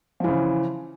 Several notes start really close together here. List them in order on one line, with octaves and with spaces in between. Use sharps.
F3 E3 C#3